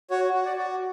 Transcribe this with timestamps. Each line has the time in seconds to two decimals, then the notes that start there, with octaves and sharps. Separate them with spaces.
0.10 F#4 C#5
0.33 F#4
0.45 D5
0.57 F#4